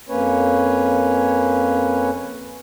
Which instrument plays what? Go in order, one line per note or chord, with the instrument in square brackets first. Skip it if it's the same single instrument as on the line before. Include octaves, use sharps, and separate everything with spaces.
[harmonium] F2 A#3 C#4 B4 C#5